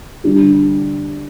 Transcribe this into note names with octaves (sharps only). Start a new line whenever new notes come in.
D3 G3 D4 G4